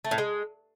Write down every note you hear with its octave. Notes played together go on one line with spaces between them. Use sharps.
A3
A2
G#3